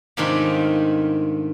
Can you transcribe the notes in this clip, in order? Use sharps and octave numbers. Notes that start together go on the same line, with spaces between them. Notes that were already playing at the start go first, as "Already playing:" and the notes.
G#2 C3 D#3 A3 D4 F4